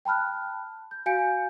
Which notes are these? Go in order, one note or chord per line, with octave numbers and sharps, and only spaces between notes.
G5 A5 B5 F6 F#6
G6
F#4 F5 G#5 G6 C#7 D7